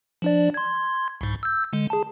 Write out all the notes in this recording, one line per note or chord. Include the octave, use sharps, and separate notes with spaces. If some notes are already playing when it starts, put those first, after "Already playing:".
F3 D4 D5
C6 G#6
C2 G#2
E6 G6
D3 G#3
G#4 A5